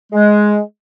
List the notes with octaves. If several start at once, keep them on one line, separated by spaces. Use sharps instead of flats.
G#3